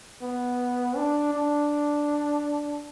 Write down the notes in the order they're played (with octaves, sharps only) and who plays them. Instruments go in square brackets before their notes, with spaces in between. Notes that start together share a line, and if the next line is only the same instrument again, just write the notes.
[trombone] B3
D4
D4